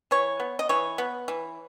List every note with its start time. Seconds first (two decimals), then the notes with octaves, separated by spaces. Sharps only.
0.11 E3 C#5
0.40 B3
0.59 D#5
0.69 E3 C#5
0.98 B3
1.28 E3